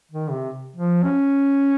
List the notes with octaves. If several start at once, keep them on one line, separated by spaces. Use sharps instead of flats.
D#3
C3
F3
C#4